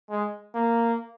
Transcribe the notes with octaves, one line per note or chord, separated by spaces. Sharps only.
G#3
A#3